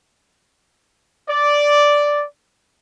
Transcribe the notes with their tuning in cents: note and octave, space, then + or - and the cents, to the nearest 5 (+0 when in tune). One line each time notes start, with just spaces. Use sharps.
D5 -5